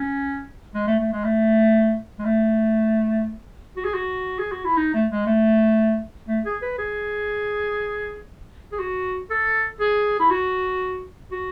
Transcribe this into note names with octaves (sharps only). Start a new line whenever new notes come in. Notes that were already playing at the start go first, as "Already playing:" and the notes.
Already playing: C#4
G#3
A3
A3
G#3
A3
G#3
A3
F#4
G#4
F#4
G#4
F#4
E4
D#4
A3
G#3
A3
A3
G#4
B4
G#4
G#4
F#4
A4
G#4
E4
F#4
F#4